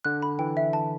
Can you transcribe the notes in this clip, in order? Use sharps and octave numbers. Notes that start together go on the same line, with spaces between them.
D3 F#6
B5
E3 G5
E5
A5